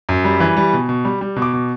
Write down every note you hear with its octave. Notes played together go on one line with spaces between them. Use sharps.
F#2
G3
E3
G3
B2
B2
G3
G3
B2
D6
B2